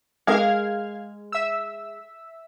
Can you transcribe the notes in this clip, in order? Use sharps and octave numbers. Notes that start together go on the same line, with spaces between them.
G#3 G#4 A#4 F5 F6 G#6
E5 E6